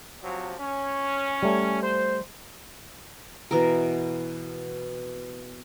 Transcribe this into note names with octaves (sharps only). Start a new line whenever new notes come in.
C3 F3 F#3
C#4
G3 A3
C5
B2 E3 A#4